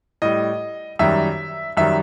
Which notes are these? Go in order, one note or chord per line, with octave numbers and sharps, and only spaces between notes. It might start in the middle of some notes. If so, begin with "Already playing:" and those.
A2 G3 D#5
F#2 D#3 G3 E5
F#2 D#3 G3 E5